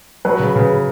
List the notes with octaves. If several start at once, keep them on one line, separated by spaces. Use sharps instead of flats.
F#3 B4
C#3
C#3